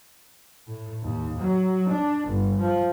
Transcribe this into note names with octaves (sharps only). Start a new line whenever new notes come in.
A2
D#2
F#3
D4
G1
F3